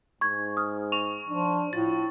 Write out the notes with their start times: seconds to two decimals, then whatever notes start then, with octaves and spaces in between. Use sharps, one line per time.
0.21 G#2 C#6 G#6
0.57 D#6 F6
0.92 C#6 F7
1.28 F3 D4
1.73 A2 F4 A6